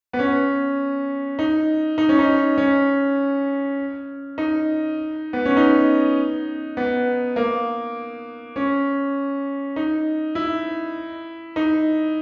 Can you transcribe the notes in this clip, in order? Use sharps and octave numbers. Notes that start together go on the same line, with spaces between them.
B3
C#4
D#4
D#4
C#4
D#4
C#4
D#4
B3
C#4
D#4
B3
A#3
C#4
D#4
E4
D#4